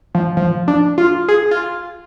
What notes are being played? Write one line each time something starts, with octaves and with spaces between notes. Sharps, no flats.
F3
F3
D4
F4
G#4
F4